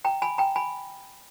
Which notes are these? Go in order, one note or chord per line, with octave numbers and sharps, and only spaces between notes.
G5 A#5
G#5 B5
G5 A#5
G#5 B5